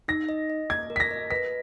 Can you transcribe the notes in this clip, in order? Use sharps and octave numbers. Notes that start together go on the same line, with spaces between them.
D#4 A#6
D#5
D#5
A#3 G#6
A#4
B6
A#6
D#5
B4 B6